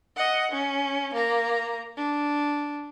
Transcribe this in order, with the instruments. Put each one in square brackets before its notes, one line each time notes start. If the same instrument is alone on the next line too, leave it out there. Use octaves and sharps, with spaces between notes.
[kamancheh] D#5 F#5
C#4
A#3 A#5
D4